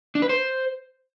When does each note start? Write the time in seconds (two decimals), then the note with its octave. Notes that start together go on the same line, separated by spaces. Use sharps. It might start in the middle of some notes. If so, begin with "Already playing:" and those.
0.15 D4
0.22 B4
0.29 C5